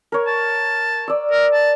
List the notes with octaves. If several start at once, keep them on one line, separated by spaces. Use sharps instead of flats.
A#4 C#5
A5
D5 E6
A#4
A5